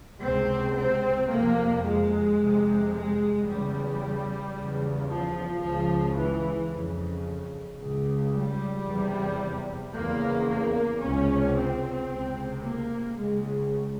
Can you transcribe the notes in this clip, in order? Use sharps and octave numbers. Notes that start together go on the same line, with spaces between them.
C#2 C3 C4
C4
F2 C3 A#3
G#3
F2 C3
G#3
E2 C#3 G3
E2 C#3
F3
C#2 C#3 F3
E3
F2 C#3
C#2 C#3
G3
E2 C3
E2 C#3 A#3
A#3
C#2 C3 C#4
C4
C#2 C3
A#3
C#2 C#3 G#3